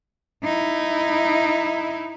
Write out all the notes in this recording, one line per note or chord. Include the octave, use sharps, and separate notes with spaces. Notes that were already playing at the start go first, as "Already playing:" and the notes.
D#4 E4